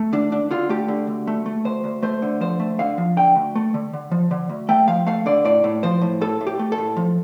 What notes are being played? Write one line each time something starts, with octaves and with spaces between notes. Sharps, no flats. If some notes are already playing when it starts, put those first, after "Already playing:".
Already playing: A3
D3 D4
D3 D4
D3 F4
A3 G4
D3
D2
A3
A3
D2 C5
D2
A3 C5
D3
F3 C5
A3
D3 F5
F3
D3 G5
D2
A3
D3
D3
F3
D3
D2
A3 G5
F3 F5
A3 F5
D3 D5
A2 D5
A2
F3 C5
A2
A2 A4
A2
G4
A3
A4
A2
F3